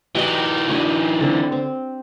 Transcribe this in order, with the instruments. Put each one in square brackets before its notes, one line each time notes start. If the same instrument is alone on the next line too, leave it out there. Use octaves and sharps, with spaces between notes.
[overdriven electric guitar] E3 D#4 [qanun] F#4 G4
[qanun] D4 F#4 G#5
D3 C4
C4